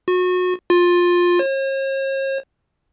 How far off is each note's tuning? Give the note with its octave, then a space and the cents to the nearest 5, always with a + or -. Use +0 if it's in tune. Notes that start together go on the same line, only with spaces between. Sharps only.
F#4 -30
F4 +15
C#5 -45